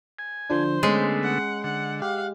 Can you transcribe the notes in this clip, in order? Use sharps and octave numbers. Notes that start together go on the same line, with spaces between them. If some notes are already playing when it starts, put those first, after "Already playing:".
G#5
D3 F3 D4 C5
D3 G#3 A3 B3 C#4 C7
F#5
D3 F#5
G4 F5 F#5